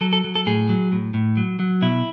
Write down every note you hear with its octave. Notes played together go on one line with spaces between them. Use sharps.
F#3 A4
A4
F#3
A4
A2 G#4
F#3
A2
A2
F#3
F#3
B2 E4